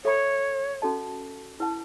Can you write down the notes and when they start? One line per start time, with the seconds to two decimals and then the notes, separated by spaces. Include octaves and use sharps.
0.04 A4 C#5 E5 B5
0.82 C#4 F#4 A4 D#5 A5
1.60 E4 B4 F#5 A5